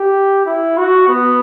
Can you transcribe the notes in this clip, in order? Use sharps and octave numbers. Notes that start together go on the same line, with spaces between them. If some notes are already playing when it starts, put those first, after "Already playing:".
Already playing: G4
E4
F#4
B3